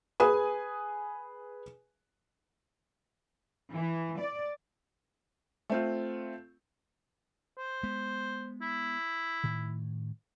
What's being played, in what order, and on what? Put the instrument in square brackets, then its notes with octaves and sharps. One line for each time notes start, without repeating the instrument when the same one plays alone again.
[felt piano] G#4 B4 G#5 D#6
[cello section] E3
D5
[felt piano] A3 C4 F4
[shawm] C5
[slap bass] G#3 B3
[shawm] E4
[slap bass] A2 D#3